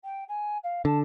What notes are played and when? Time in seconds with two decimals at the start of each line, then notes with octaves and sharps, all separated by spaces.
0.04 G5
0.28 G#5
0.63 F5
0.85 D3 A5